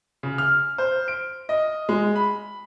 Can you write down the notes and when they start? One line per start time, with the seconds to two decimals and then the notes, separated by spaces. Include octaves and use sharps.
0.23 C#3
0.38 F6
0.78 C5
1.08 D7
1.49 D#5
1.89 G#3
2.15 B5